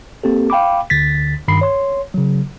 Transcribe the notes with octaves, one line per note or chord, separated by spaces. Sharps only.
A#3 C4 G4 A4
F5 G5 B5 D6
D2 D3 A6 B6
G2 D#3 B5 C7
C#5 C6
C#3 F#3